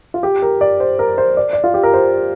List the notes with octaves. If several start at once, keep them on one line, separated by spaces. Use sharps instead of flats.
F4
G4
A#4
D5
C5
A#4
C5
D5
D5
F4
G4
A#4
C5